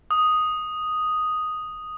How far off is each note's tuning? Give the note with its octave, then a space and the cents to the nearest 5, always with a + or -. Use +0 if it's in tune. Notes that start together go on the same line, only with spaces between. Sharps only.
D#6 +0